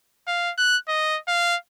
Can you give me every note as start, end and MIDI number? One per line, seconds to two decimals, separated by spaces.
0.27 0.51 77
0.58 0.77 90
0.88 1.18 75
1.28 1.56 77